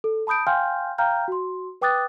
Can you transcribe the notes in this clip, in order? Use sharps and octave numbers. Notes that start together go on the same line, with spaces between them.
A4
A5 B5 D#6 G6 D7
F5 G5 G#5 C6 F6 G6
F5 G5 A#5 F6 G6
F#4 C6
B4 G5 D6 D#6 F#6 A6